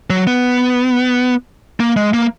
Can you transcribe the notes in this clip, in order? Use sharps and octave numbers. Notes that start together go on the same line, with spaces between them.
F#3
B3
A#3
G#3
A#3